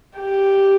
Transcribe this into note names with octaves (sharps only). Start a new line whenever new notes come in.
G4